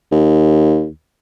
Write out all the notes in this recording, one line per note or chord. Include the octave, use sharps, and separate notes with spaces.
D#2